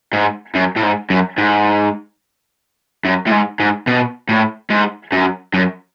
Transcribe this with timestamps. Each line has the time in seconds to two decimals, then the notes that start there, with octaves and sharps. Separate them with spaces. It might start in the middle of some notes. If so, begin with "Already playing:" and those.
0.13 G#2
0.55 F#2
0.76 A2
0.83 G#2
1.10 F#2
1.38 G#2
3.05 F#2
3.27 A2
3.32 G#2
3.60 G#2
3.87 B2
4.29 A2
4.70 G#2
5.12 F#2
5.54 F#2